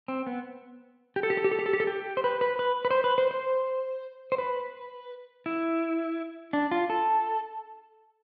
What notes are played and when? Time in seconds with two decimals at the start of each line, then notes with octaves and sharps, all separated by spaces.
0.08 C4
0.27 B3
1.16 G4
1.23 A4
1.30 G4
1.37 A4
1.44 G4
1.51 A4
1.59 G4
1.66 A4
1.73 G4
1.80 A4
1.87 G4
2.17 C5
2.24 B4
2.41 B4
2.59 B4
2.85 B4
2.91 C5
3.04 B4
3.18 C5
3.31 C5
4.32 C5
4.38 B4
5.46 E4
6.53 D4
6.71 F4
6.90 A4